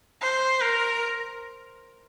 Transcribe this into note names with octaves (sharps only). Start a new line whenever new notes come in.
C5
A#4